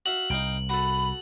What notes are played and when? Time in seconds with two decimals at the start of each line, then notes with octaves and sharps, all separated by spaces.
0.06 F#4 E5 F5 F#7
0.30 C2 D#4 F5 G5
0.69 F#4 A4 B5